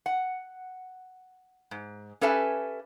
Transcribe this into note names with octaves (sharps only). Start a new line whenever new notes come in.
F#5
G#2
C#4 G4 A4 B4 E5 G#5